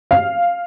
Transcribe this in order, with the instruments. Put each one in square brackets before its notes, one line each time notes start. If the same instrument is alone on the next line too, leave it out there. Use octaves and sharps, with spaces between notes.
[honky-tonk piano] F5